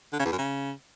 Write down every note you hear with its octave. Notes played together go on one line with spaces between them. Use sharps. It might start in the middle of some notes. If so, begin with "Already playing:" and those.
D3
C#3
E2
F#2
C#3